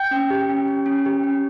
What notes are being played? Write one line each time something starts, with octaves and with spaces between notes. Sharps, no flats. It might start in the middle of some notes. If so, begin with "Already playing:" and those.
Already playing: G5 G6
C#4
G4
C#4
C#4
C#4
G4
C#4